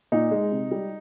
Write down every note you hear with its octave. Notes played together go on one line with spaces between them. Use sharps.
A#2 D#4
G#3
C3
G3